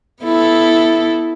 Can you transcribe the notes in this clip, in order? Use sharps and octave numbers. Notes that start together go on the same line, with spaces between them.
B3 E4 A4